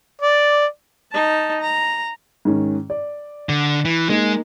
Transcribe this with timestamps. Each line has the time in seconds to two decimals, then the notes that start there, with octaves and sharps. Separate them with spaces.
0.21 D5
1.12 D#4 A5
1.61 A#5
2.45 G#2 D#3 C#4
2.90 D5
3.49 D3
3.85 E3
4.10 G#3 A#3 D#4 A#4